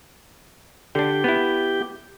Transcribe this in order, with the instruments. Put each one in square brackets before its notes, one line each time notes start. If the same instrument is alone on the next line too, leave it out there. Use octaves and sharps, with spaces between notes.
[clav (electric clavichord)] D3 D4 [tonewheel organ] G4
[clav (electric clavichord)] B3 E4